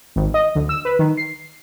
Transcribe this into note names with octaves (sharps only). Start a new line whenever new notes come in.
G#1
D#5
D2
E6
B4
D#3
C7